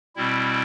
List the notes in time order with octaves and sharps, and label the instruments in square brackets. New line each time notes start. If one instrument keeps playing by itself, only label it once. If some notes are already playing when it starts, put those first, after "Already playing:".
[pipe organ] B2 G3 C4 E4